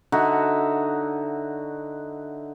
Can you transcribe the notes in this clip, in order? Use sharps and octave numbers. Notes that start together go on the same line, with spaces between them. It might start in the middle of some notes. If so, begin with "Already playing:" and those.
D3 D#4 F#4 E5